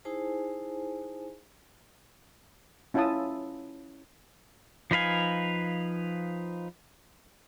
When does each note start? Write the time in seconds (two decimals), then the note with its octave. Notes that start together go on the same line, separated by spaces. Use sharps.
0.05 D#4 E4 G#4 C5 G#5 A5
2.94 C#4 E4 F4 E5 A5 D#6
4.91 F3 D#4 B4 F5 G#5